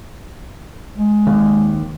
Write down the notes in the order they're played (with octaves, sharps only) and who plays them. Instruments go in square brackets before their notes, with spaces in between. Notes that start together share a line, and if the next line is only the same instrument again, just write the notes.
[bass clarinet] G#3
[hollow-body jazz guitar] D#2